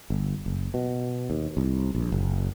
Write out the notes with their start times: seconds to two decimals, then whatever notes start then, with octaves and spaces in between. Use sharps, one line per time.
0.10 G1
0.46 F#1
0.74 B2
1.30 D#2
1.57 C2
1.95 A#1
2.12 F#1